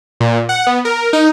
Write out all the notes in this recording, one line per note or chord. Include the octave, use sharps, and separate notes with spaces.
A#2
F#5
B3
A#4
D#4